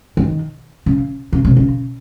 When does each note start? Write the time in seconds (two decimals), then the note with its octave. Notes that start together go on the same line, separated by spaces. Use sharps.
0.17 D#3
0.86 C#3
1.33 C#3
1.45 C3
1.57 C#3